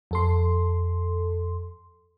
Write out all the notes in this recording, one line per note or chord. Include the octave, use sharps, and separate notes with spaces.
F2 A4 C6